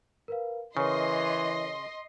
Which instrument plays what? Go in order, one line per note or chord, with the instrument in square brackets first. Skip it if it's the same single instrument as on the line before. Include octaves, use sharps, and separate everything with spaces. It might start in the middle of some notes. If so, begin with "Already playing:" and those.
[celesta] A#4 B4 F5
[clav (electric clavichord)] C#3 [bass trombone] E3 [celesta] A#4 B4 C#5 [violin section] D#5 C6